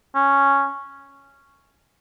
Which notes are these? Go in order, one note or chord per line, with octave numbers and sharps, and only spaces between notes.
C#4